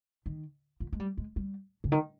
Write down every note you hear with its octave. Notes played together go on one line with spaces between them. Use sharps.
D#3
F3
G#3
G3
G#3
G3
C#3
D#3